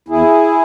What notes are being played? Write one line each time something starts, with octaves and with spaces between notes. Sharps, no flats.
E2 E4 G#4